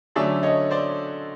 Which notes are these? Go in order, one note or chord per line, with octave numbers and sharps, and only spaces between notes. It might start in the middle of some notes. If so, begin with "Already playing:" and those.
D3 F#3 A3 C#4 D5 E5
C#5 D#5
C5 D5